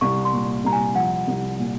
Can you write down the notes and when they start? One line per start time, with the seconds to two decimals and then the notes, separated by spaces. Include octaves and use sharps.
0.01 C2 C#6
0.25 C6
0.33 A#2
0.65 C2 A#5
0.72 G#5
0.95 F3 F#5
1.28 C2
1.59 A#2